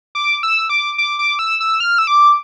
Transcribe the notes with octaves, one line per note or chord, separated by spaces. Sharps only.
D6
E6
D6
D6
D6
E6
E6
F6
E6
D6